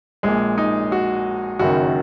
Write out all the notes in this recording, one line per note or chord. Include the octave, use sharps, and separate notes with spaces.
A#1 A#2 G#3
D#4
F#4
F#1 F#2 D#3 F#4